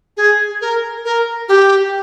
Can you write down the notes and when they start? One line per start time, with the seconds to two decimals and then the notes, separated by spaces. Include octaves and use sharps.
0.17 G#4
0.61 A#4
1.05 A#4
1.49 G4